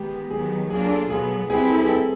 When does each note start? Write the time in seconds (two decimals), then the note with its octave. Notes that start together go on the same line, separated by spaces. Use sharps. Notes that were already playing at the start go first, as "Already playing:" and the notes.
Already playing: D#3 G#3 B3 G4
0.30 D#3 F#3 B3 G#4
0.70 F#3 A#3 D4 F4 G#4
0.80 G#4
0.90 A4
1.10 B2 F#3 B3 G#4
1.49 G3 C4 E4 G4 G#4 B4
1.69 A4
1.81 G#4
1.89 A4